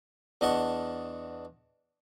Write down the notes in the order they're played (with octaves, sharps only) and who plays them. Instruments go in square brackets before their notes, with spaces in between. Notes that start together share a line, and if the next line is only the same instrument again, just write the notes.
[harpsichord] E2 D4 D#5 F#5 A5 C#6